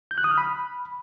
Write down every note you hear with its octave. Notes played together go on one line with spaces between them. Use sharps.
G6
F#6
D#6
F6
B5